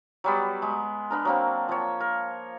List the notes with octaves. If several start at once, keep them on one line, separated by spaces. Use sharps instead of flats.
F#3 G3 B3
G#3
B3 D4 A#4
F#3 A#3 C4
F3 C#5
A#4